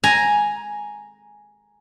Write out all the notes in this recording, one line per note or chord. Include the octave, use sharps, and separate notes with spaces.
G#5 A#5